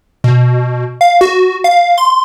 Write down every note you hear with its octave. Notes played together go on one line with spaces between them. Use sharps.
B2
F5
F#4
F5
C6